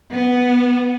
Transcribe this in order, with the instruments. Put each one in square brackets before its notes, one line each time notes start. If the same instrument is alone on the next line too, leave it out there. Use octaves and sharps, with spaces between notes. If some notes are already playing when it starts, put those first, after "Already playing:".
[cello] B3